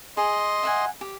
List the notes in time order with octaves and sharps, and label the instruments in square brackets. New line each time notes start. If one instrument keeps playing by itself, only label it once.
[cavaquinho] G#4 [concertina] D#5 C6
[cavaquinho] E5 F#5 G#5
G4